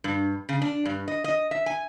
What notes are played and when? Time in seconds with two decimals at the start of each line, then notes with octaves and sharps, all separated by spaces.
0.04 G2
0.49 C#3
0.62 D4
0.85 G2
1.08 D#5
1.24 D#5
1.51 E5
1.66 G#5